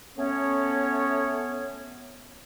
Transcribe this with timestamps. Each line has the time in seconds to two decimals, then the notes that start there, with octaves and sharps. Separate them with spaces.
0.17 A3 B3 C#4 C#5